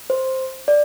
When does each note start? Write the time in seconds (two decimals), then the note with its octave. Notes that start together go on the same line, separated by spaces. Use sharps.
0.10 C5
0.68 D5